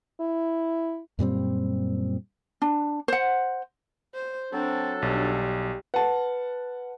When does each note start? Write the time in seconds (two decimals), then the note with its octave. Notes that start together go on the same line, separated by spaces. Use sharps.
0.20 E4
1.19 F#2 A#2 G3 C4
2.62 D4
3.08 C5 F#5
4.15 C5
4.52 F#3 C4 D4 A4
5.02 B1 G3
5.94 B4 F#5 A5